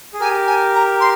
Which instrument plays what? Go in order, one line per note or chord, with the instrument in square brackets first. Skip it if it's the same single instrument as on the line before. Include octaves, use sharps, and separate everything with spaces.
[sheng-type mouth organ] G#4
[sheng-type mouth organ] G4 A#4 [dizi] G#5
[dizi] G#5
A#5
C6